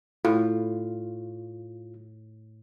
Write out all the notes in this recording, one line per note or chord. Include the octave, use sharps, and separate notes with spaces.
A2 F4